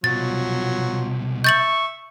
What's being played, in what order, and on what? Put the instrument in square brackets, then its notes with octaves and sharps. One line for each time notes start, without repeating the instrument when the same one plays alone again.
[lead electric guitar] C2 B2 [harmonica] F3 F#3 [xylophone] A6
[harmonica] E5 [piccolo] C#6 [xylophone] G6 A6 F#7